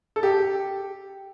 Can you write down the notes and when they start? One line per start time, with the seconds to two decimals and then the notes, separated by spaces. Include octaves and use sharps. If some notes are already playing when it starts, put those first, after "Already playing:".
0.16 A4
0.23 G4